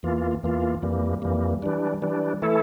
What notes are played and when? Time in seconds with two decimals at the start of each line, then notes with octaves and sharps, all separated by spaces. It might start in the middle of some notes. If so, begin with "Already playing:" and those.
0.03 E2 E3 A#3 F4
0.43 E2 E3 A#3 F4
0.82 F2 E3 G3 A#3
1.22 F2 E3 G3 A#3
1.62 E3 G3 D4
2.02 E3 G3 D4
2.42 E3 A3 E4 A4